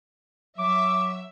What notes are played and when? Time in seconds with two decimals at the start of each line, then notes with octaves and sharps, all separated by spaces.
0.58 F#3 E5 D6